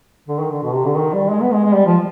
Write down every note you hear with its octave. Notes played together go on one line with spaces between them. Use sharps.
D3
D#3
D3
B2
C3
D3
D#3
G3
G#3
B3
G#3
G#3
G3
F3